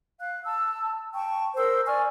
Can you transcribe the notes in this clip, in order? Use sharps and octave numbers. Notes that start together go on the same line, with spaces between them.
F5 F#6
A5 E6
G5 A5 C#6
A#4 C5 E6
D5 G#5 C#6 F6